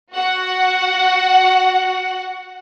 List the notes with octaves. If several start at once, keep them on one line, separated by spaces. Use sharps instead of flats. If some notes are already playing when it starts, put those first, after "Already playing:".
F#4 F#5